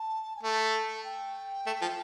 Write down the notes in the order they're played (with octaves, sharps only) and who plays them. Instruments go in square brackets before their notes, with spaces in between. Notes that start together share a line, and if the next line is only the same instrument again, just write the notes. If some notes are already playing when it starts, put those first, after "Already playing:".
Already playing: [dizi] A5
G#5
[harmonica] A3 [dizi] A5
[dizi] G5
[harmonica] A3
F3